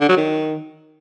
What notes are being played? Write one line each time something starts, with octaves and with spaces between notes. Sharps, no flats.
D3
F#3
D#3